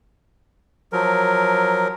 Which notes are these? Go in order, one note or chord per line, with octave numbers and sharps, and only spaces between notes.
F3 F#3 A#4